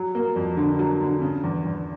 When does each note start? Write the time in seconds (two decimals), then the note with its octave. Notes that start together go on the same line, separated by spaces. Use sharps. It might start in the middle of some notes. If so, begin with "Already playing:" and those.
Already playing: F#3
0.15 A#3
0.36 F2
0.57 D3
0.79 F#3
1.01 D3
1.21 C#3
1.43 E2
1.65 E2